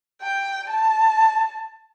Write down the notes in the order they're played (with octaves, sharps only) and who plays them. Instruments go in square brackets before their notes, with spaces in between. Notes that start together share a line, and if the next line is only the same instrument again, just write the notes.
[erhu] G5
A5